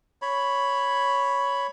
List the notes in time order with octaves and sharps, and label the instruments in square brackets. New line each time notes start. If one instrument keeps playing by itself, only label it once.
[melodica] C#5 B5